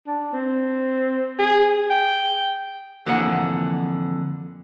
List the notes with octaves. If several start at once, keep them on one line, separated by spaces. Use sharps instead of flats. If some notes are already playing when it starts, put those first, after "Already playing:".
D4
C4
G#4
G5
F2 D3 E3 A#3 F#5